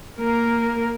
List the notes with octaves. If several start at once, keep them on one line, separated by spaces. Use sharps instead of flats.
A#3 A#4